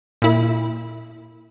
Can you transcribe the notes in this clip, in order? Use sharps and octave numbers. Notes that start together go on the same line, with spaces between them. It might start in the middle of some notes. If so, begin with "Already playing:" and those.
A#2 E4